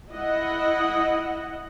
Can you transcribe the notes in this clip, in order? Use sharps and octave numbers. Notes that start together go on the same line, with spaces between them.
E4 D#5 F#5